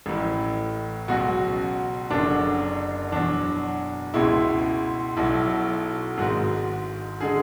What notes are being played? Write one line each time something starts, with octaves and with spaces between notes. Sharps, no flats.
A1 A2 E3
C#2 B2 F#3 F#4
F#1 F#2 D3 F#3 D4
E2 B2 F#3 D4
C#2 B2 G#3 E4
B1 B2 F#3 E4
G#1 G#2 G#3 F#4
D3 G#3 G#4